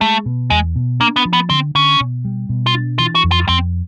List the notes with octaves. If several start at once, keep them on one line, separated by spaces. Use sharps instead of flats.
G#3 A3
B2
E2 G#3
B2
A#3 D4
B3
F3
B3
D3 C4
D3 C#4
B2
G3
B2
F4
D4
E3 F4
F#4
F2
F4
F2 C4